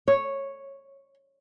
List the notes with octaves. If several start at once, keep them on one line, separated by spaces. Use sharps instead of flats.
C#5